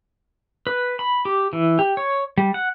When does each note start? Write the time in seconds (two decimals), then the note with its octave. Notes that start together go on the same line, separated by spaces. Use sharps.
0.67 B4
0.99 B5
1.25 G4
1.53 E3
1.79 G4
1.97 C#5
2.38 G3
2.54 F#5